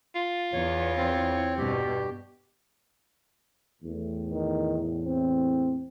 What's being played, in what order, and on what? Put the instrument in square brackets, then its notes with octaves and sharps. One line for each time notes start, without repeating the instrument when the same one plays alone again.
[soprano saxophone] F4
[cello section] E2 [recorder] C#5
[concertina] C4
[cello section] G2 B2 [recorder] G4
[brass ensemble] E2 A2
[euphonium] D#3
C4